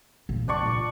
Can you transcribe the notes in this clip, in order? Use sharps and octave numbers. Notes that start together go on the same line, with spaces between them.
D#1 A#2
F#1 D4 D5 C#6
A#2 F4